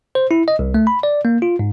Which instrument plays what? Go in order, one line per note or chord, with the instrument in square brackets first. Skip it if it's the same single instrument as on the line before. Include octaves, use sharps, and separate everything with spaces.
[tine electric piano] C5
E4
D#5
C2
A3
B5
D5
A#3
F4
G#2